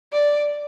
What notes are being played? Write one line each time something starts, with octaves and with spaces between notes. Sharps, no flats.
D5